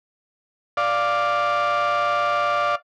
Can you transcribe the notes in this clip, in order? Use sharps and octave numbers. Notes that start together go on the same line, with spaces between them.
D5 F5